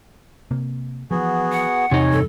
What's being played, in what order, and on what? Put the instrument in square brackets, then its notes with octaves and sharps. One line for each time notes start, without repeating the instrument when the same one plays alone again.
[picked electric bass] C3 A#3
[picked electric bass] E3 F3 [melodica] B3 F#4 G#4
[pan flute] F#5
[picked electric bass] E2 [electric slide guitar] C3 D#4 [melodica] C#5 G#5
[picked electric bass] E2 G2 [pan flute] A4